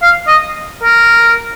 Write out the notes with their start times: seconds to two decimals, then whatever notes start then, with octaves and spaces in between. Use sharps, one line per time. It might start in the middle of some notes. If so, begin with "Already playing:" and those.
0.02 F5
0.28 D#5
0.83 A#4